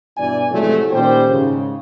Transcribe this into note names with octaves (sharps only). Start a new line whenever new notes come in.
G2 B2 E3 D5 G#5
A2 C3 F3 F#3 G#3 A3
A#2 D#3 G3 C#4 C5 G5
G#2 C#3